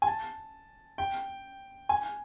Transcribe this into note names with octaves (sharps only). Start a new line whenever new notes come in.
G#5
A5
G5
G#5